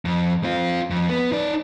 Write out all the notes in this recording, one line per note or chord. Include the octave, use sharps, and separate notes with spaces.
F2
C4 F4
F2
B3
D#4 D5